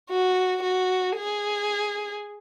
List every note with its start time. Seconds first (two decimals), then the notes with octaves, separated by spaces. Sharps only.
0.11 F#4
0.63 F#4
1.17 G#4